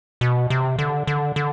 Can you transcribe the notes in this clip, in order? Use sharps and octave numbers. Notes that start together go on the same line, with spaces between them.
B2
C3
D3
D3
D3